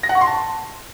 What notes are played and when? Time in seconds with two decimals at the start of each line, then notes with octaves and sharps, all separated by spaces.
0.03 A#6
0.09 F#5
0.15 C#6
0.21 C6
0.27 A5